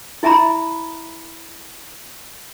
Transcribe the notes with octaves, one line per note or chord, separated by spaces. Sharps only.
E4 E5 G#5 A#5 B5